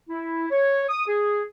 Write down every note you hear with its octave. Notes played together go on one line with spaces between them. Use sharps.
E4
C#5
D#6
G#4